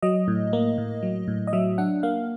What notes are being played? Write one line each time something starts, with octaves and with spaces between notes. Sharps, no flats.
F#3 D#5
A2
A#3
A2
F#3
A2
D#5
F#3 E5
D4 F#5
A#3 F5